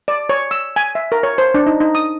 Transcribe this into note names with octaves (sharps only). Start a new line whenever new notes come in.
D5
C#5
E6
G#5
E5
A#4
C#5
C5
D4
D#4
D#4
D#6